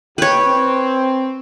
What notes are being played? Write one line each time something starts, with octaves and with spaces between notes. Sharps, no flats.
D#2 B4 C#5 G5
C4